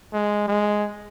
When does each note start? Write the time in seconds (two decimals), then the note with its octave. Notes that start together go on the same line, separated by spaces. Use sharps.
0.13 G#3
0.48 G#3